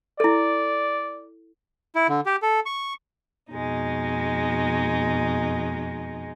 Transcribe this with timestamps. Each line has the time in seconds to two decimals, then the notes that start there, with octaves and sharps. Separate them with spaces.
0.20 E4 A4 D5
1.95 E4
2.09 D3
2.26 G4
2.42 A4
2.66 C#6
3.51 F2 B2 G#3 D#4